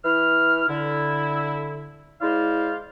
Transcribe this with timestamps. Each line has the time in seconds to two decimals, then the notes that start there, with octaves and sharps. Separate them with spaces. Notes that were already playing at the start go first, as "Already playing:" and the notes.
0.04 E3 E4 F6
0.68 D3 E4
2.21 G#3 E4 C5 D5 F5